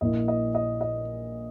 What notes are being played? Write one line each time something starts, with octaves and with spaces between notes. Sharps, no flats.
A#1 A#2 A#3 E4 D#5
D#5
D#5
D#5